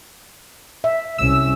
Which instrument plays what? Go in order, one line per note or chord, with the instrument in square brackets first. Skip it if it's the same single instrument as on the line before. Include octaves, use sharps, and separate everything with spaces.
[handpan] E5
[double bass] C2 C#4 [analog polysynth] E6